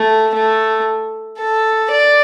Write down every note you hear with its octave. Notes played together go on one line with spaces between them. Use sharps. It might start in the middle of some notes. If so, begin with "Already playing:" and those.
Already playing: A3
A3
A4
D5